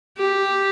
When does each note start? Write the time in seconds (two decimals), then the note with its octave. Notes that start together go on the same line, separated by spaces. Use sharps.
0.17 G4